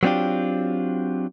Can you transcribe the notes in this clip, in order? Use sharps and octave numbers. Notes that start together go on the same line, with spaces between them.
F#3 B3 C4 D4 F4 G4